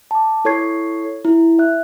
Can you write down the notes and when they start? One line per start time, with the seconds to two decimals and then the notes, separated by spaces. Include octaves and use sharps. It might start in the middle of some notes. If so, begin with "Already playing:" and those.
0.11 A5 D6
0.45 E4 A4 C#5 C#6 G#6 C7
1.25 E4
1.59 E5 F#6